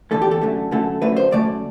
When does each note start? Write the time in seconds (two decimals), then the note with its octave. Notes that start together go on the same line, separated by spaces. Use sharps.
0.11 E2 D3 A3 A4
0.22 G4
0.31 A4
0.42 F#2 D3 A3
0.71 F#2 D3 A3 A4
1.02 F#2 D3 A3 B4
1.17 C5
1.31 F#2 D3 A3 D5